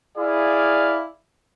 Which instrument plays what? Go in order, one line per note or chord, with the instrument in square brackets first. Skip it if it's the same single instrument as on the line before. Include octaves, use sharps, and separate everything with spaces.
[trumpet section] E4 G#4 D5 F5